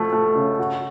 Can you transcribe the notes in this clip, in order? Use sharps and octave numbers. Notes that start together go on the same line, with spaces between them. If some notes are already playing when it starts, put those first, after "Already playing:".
Already playing: B2 F3 A3
A3
C#3
F#4